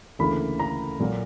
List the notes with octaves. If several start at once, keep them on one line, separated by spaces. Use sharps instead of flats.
D2 C#3 E3 A#3 B5
A#5
A#2 F#3 A#3